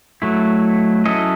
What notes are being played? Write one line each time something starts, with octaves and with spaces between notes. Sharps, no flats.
F#3 A3 E4
F#3 C#4 E4 A4 D#5